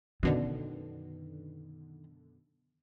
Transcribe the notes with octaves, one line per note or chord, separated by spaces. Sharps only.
F#2 B2 D3 D#3